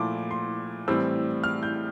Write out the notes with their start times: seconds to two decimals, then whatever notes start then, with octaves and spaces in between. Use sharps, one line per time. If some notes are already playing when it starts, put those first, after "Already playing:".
Already playing: A#2 F3 A3 E4 C6 D6
0.31 C6
0.88 A2 E3 G3 C4 E6
1.44 F6
1.63 G6